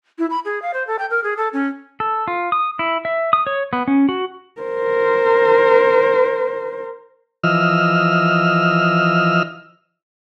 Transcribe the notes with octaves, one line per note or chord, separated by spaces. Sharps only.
E4
B5
G#4
F5
C5
A4
G5
A#4
G#4
A4
C#4
A4
F4
D#6
E4
E5
D#6
C#5
B3
C#4
F#4
A#4 C5
E3 F3 D#5 E6 F6